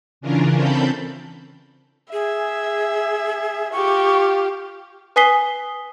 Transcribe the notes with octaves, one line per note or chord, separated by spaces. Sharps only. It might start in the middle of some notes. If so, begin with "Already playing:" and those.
C#3 E3 C#4 D4 F4 A#4
C4 A4 A5 B5 G6
G#4 E5
F4 G4 C#6
B4 G#5 D#6 B6 C7 G7